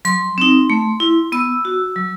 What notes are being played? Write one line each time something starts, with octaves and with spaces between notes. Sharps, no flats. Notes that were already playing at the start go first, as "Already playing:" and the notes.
F#3 C6
C4 D#4
A3
E4
B3 E6
F#4
F#3